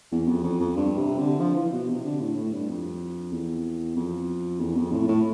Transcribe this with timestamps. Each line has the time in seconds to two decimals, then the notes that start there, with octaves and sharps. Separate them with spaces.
0.12 E2
0.28 F2
0.43 F2
0.60 F2
0.76 G2
0.97 C3
1.18 D3
1.40 F3
1.56 E3
1.72 B2
1.88 C3
2.04 D3
2.20 A2
2.36 A2
2.52 G2
2.68 F2
3.32 E2
3.96 F2
4.60 E2
4.76 F2
4.92 A2
5.08 A2